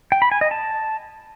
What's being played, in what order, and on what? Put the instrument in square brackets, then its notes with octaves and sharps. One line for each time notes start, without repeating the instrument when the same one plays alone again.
[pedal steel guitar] G5
B5
G#5
D#5
A5